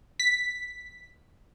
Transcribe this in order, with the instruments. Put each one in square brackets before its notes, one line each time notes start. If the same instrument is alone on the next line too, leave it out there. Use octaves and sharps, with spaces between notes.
[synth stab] B6